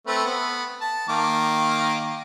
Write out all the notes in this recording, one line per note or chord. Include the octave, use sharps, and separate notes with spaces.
A3 C4 B4
B3
A5
D#3 A#3 D6